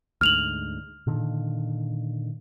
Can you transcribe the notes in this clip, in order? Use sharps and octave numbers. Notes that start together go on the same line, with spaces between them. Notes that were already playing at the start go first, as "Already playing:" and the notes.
D2 G#2 F6 F7 F#7
A#2 D3 D#3